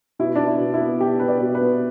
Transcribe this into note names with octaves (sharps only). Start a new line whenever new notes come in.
B2 E4
B3 D4
E4
B2
E4
B3
B2 G4
B3 B4
D5
B2
B4
B3